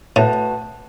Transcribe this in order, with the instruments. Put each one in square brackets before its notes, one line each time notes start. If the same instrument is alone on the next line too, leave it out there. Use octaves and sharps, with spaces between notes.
[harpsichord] A2 [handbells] A3 F#4 B4 F#5 A5